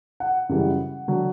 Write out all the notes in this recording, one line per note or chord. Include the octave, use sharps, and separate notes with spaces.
F#5
F#2 C#3 E3 G3
D3 F#3